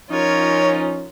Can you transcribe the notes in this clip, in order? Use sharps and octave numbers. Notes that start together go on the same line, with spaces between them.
F3 C#4 D#4 F4 A#4 C#5